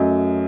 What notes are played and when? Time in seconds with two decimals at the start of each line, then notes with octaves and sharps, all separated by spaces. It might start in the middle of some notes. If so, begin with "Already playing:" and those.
Already playing: F#2 F#3 A3 D#5